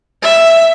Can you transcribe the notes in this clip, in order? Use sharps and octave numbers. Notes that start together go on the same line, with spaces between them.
E5